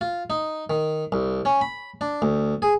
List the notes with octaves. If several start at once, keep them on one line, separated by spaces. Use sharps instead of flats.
F4
D#4
D#3
C2
C#4
B5
D4
D2
G#4